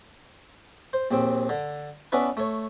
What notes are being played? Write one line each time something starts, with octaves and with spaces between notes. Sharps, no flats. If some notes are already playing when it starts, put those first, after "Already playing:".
C5
A#1 D#2 C4
D3
B3 C#4 D4 E4 B4
A3 C#5